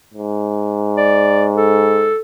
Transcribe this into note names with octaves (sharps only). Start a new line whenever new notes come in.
G#2
D5
A4